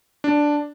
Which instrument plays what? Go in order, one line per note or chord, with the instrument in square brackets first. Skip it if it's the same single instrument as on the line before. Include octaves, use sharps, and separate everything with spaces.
[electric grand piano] D4